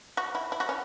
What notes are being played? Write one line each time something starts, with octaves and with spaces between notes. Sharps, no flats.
F#4
E4
E4
F#4
C#4